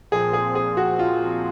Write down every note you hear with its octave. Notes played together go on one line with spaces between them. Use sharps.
A#2 F3 C4 G#4
G#4
G#4
F#4
F4